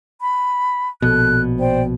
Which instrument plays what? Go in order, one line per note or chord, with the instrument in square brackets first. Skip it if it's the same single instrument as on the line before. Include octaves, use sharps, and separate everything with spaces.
[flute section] B5
[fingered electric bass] A#1 B2 [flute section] A4 F#6
[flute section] C5 D5 G5